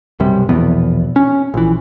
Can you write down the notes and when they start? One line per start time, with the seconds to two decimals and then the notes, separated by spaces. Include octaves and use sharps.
0.20 B1 F#2 C3 G3
0.49 E1 A#1 E2 B3
1.16 C#4
1.54 A#1 E3